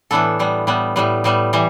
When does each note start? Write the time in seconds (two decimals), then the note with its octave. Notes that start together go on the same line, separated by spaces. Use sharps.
0.11 A2 E3 B3 D4 A4
0.39 A2 G3 B3
0.67 A2 G3 B3
0.96 A2 G3 B3
1.24 A2 G3 B3
1.53 E3 G3